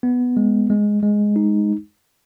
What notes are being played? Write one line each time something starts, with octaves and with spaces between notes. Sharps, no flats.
B3
G#3
G#3
G#3
D#4